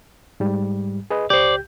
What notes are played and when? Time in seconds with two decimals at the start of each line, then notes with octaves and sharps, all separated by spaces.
0.40 G#2 G3
1.10 G#4 B4 D#5
1.30 C#2 G4 C5 D5 G6